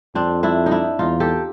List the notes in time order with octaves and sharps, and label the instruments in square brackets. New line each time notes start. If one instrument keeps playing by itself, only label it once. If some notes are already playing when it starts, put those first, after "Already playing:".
[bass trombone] F2 [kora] C4 D4
[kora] D4 E4
D#4
D4 E4
[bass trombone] E2 [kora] D#4 F4
[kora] G4 A4